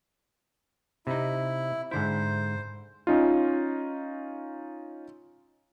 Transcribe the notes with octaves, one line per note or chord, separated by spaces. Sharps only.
C3 D#4 E4
G#2 D3 E4 C5
C#4 D#4 F4